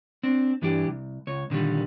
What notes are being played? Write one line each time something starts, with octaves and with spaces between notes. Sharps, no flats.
C4 D4
G2 E3 D4 G4
C2
C#2 C#5
A#2 D3 D#3 G3